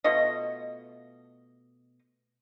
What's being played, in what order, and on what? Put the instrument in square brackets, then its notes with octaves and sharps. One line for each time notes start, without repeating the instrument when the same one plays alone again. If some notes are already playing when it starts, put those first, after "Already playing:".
[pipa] B2 A3 F4 D#5